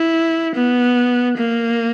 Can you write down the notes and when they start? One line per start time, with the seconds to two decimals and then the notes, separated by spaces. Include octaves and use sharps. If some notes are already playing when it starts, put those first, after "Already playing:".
Already playing: E4
0.55 B3
1.37 A#3